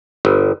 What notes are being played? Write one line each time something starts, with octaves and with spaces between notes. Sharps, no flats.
G1